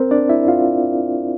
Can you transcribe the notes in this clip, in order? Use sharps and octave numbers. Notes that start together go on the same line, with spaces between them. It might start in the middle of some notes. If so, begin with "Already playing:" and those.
Already playing: C4 A#4 C5
D4 D5
E4 E5
F4 F5